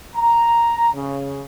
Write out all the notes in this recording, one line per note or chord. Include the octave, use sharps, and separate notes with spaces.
A#5
C#3